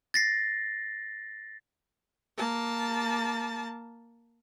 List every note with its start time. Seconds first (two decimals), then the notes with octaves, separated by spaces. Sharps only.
0.14 A6 A#6 C7
2.38 A#3 A5